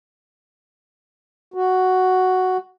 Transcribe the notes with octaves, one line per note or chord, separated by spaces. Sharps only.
F#4